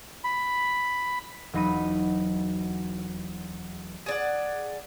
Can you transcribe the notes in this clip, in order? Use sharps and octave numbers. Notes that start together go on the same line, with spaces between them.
B5
E1 F#3 D#4 B5 D#7
G#4 D5 F#5